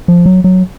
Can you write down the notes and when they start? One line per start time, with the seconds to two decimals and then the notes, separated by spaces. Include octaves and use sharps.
0.08 F3
0.26 F#3
0.44 F#3